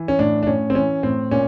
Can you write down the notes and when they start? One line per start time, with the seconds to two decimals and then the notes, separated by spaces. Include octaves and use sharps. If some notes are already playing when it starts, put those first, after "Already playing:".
Already playing: E3
0.08 C#4
0.19 A2 D4
0.43 D4
0.47 A2 C#4
0.70 C4
0.75 E3 C#4
1.03 A2 C4
1.31 A#2 C#4